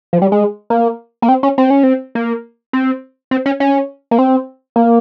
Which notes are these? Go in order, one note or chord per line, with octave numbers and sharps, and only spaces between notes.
F3
G3
G#3
A#3
A#3
C4
C#4
C4
C#4
C4
A#3
C4
C4
C#4
C#4
A#3
C4
A#3